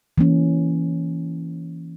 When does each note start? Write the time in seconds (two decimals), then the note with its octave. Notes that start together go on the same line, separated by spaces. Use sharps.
0.18 E3 A#3 C#4